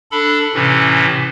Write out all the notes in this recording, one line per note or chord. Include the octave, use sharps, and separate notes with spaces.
D4 A4 B5
A2 C3 E3 C#4